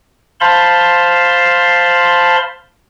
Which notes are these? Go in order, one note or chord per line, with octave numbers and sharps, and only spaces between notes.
C5 F5 A5 B5 C6